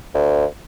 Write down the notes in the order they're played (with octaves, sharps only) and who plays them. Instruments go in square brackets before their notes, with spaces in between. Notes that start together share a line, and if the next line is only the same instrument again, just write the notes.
[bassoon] D2